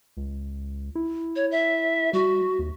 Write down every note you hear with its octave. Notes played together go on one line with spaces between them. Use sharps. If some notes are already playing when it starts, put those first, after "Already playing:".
C#2
E4
C#5
E5
G3 F#4
D#2